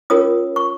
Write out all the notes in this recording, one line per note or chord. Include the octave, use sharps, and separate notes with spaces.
C#4 F4 A#4 C#5 D#6
C#6